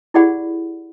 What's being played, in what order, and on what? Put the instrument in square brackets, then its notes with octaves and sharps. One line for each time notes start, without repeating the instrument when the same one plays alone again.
[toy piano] E4 G4 G#4 D5 F#5 B5